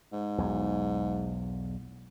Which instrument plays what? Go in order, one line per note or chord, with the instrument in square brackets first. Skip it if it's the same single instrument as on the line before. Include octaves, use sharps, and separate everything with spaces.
[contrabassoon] G#2
[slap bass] B1 E2